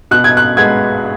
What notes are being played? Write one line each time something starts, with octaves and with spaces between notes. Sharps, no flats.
B2 F#6
G#6
F#6
G#3 B3 G#6